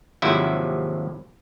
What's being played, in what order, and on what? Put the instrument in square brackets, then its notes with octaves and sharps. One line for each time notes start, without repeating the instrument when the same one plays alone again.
[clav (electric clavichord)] G#1 D#2 C3 F3 F#3 E4